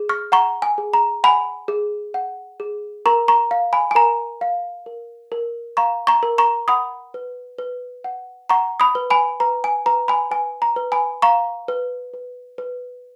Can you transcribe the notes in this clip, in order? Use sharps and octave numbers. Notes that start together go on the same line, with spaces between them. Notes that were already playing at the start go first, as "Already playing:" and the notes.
Already playing: G#4
C#6 F6
F#5 A#5 C#6
G#5
G#4
A#5
F#5 G#5 B5
G#4
F#5
G#4
A#4 A#5 C#6
A#5 C#6
F5
G#5 B5
G#5
A#4 A#5
F5
A#4
A#4
F5 A#5 C#6
A#5 C#6
A#4
A#5 C#6
F#5 B5 D#6
B4
B4
F#5
F#5 A#5 C#6
B5 D#6
B4
G#5 B5
B4 A#5
G#5
B4 A#5
G#5 B5
B4 G#5
A#5
B4
G#5 B5
F5 A#5 C#6
B4
B4
B4